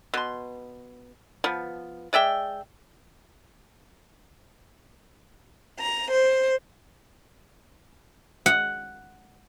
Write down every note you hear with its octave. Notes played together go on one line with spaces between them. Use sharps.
B2 C6
F3 B3
G#3 D5 E5 G5
A#5
C5
F#5